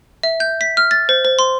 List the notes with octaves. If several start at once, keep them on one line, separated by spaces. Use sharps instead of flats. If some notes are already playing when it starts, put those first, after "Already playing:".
E5
G6
B6
F6
A6
C5
C5
C6